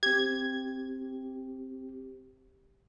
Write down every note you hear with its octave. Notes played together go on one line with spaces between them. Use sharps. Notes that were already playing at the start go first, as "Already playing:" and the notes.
C4 G4 G#6